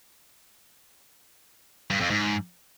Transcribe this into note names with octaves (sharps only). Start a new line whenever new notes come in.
G2
F2
G#2